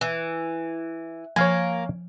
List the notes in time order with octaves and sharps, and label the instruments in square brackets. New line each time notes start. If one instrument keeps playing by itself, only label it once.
[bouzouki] E3
[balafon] F3 [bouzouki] A#3 [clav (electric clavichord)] C#5 F5 G#5